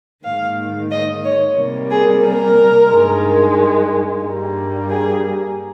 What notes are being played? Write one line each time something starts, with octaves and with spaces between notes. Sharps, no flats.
G#2 D#3 A#3 F5
D#5
C#5
C3 G3 A#3
G#4
A#4
G2 D#3 G#3
G2 G3 A#3
G#4